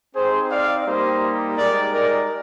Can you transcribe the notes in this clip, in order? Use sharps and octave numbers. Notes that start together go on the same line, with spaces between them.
C4 D#4 G4 G#4 C5
D5 F5
G3 A#3 D#4 G4 C5 D#5
G#3 D#4 G4 A#4 D5
A#4 D5